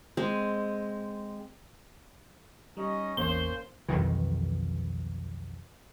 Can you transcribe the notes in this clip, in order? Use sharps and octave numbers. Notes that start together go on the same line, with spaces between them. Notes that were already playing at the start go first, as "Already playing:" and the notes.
G#3 C4
G3 C#4 D#4 D#5
A1 E2 A#3 C#4 C5 G7
B1 F2 D#3 E3